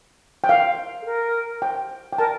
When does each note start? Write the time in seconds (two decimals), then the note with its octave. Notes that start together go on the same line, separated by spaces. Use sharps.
0.44 G5
0.49 F5
1.02 A4
1.05 A#4
1.62 G5
2.13 G5
2.18 A#4 A5